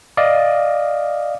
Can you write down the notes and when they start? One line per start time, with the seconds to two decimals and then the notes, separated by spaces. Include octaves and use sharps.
0.17 D5 D#5 F5